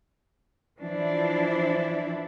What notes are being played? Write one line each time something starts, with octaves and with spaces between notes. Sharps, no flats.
E3 F3 D4 E4